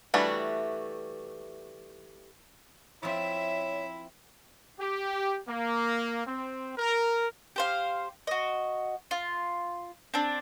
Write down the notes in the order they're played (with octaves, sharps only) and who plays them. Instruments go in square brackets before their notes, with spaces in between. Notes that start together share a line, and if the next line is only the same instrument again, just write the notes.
[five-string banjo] E3 G3 A3 D4 F#4
[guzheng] F3 C4 [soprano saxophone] E4 [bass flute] C#5 [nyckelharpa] E5
[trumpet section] G4
A#3
C4
A#4
[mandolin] G4 C5 F5
F#4 D#5
F4
C4 D4